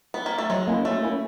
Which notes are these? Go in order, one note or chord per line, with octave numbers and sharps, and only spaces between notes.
B3
A#3
A3
F#3 G#3
A#3 C#4 E4
F#3 A3
A#3 C#4 E4